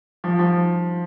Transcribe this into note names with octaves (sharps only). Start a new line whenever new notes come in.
F3
F3